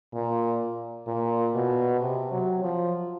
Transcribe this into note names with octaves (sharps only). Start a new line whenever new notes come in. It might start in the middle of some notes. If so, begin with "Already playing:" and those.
A#2
A#2
B2
C3
F#3
F3